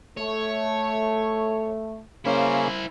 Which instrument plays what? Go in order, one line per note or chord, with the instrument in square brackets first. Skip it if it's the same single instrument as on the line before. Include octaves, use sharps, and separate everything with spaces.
[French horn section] A3 [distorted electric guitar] C#5
[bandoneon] C#3 A#3 C#4 [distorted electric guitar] E4 C5